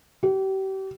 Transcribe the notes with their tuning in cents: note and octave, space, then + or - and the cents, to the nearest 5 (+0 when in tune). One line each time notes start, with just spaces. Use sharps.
G4 -35